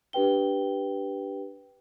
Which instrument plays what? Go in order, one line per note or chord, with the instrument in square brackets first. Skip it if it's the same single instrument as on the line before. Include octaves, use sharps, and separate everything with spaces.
[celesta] D4 G4 B4 G5 G7